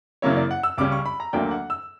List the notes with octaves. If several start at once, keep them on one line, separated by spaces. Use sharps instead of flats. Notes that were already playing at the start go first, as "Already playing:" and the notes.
F#2 C#3 F#3 A#3 E4 C#5
D5
F#5
E6
C#2 C#3 G3 C#4 D6
C#6
B5
A#5
D2 D3 F#3 A#3 D4 G5
F#5
E6